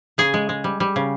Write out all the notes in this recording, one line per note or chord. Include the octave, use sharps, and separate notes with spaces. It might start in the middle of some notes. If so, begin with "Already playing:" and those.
C#3 G#4
G#3
G#3
G3
G3
C#3